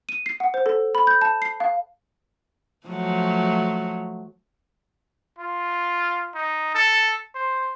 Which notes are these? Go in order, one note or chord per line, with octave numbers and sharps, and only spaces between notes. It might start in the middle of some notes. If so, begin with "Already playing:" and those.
D#7
C7
F#5
C5
A4
B5
G6
A5
C7
F5
F3 F#3 A3
F4
D#4
A4
C5